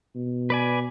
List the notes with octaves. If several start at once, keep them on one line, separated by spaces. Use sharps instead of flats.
B2
B4 D5 G#5